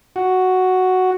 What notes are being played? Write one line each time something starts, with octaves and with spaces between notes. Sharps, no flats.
F#4